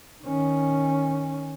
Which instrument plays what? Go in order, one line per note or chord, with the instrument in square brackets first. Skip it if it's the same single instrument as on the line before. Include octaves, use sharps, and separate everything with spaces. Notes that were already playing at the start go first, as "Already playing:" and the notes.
[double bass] D#3 C#4